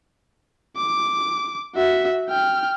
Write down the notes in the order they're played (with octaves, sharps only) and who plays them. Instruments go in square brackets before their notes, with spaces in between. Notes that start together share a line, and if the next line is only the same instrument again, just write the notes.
[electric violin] D6
F#4 E5
G5 F6